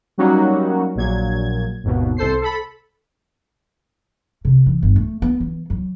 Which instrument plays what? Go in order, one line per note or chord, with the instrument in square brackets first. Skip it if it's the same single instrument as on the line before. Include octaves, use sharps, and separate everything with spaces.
[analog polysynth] F#3 G3 A#3 C#4 D#4 F#4
A#1 A#2 F#3 G#6
G#1 D#2 B2
C2 A4 C5 C7
A4 B5
[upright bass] C3
E3
G1
A3
B3
E3
F#3